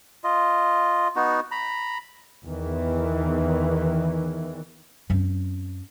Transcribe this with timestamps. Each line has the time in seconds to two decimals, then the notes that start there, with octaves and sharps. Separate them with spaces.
0.24 F4 D#5
1.16 B3 D#4 F#4
1.51 A#5 B5
2.45 E2 D#3 E3
5.10 F#2 C4